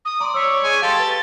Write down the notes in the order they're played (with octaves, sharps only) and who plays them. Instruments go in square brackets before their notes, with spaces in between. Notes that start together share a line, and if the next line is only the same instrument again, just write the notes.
[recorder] D#6
[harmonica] D5 [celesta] A#5 C6
[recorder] C#5 [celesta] E6 B6
[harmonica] G#3 G#5
[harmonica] G4 A4 [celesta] F5 G5 C6 [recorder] A6
[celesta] B4 G7